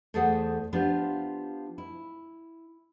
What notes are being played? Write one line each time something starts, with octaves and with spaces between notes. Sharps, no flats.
E2 A3 G#4 A4 C5 F#5
F3 B3 D4 F4 G4
E4